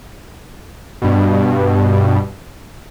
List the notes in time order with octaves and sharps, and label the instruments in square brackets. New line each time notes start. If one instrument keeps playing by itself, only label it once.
[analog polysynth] G2 B2